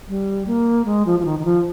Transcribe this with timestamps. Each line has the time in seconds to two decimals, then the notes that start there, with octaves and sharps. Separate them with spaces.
0.08 G3
0.47 A#3
0.86 G#3
1.06 F3
1.20 F3
1.25 D#3
1.39 D#3
1.45 F3